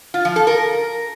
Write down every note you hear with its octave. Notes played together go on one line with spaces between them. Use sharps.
F4
F3
A4
A#4